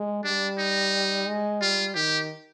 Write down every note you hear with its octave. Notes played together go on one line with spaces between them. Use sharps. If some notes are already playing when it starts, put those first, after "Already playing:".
Already playing: G#3
G3 D4
D#4
G#3
G3 F4
D#3 G4